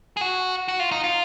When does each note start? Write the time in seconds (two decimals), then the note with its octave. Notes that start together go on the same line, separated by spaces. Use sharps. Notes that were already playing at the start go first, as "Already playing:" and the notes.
0.17 G#4
0.21 F#4
0.68 F#4
0.79 F4
0.91 D#4
1.04 F4